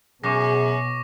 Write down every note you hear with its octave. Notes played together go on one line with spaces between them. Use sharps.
F#2 B2 G#4 C#6 D6 A#6